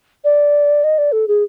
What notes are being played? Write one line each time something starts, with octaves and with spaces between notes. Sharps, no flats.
D5
D#5
D5
A4
G#4